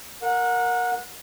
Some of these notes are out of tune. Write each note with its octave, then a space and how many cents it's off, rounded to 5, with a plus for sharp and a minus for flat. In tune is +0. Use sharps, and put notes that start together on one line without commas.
A#4 +0 F#5 -25